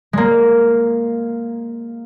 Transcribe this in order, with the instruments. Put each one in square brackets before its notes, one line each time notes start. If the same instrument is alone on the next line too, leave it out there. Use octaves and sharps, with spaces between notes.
[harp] G#3 A#3